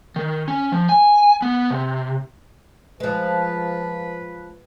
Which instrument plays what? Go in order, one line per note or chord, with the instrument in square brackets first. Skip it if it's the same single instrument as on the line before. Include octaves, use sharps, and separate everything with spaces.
[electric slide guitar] D#3
C#4
F3
G#5
B3
C3
[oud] F3 G#3 [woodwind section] B4